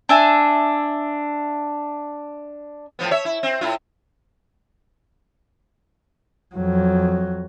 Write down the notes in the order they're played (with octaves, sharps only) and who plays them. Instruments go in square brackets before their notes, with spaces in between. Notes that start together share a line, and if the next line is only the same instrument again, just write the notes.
[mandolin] D4 E5 G#5
[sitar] A2 F3 B3
C#5 E5
E4
C4
A2 E4 F4
[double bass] F2 F#3